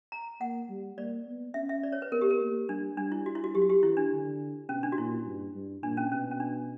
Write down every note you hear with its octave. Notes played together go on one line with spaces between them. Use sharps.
A#5
A#3 F#5
G3
A#3 D5
B3
C#4 E5
E5
D5
C#5
B4
B3 A#4
G4
A#4
A#3
G3 D4
G3 D4
E4
F#4
E4
F#4
F#3 G4
F#4
G4
E3 E4
D4
D3
B2 C#4
D4
F#4
A#2 E4
G2
G2
A#2 D4
C#4
B2 C#4
C#4
D4